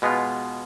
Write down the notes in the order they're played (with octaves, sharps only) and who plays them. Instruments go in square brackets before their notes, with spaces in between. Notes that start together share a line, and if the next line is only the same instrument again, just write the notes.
[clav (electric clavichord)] B2 G#3 B3 F4